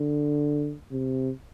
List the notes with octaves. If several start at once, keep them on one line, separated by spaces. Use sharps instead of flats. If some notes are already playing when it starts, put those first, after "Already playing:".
Already playing: D3
C3